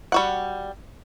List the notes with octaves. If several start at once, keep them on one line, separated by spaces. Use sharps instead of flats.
G3 F#4 F#5